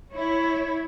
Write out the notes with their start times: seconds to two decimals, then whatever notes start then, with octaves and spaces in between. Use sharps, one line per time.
0.13 E4 C#5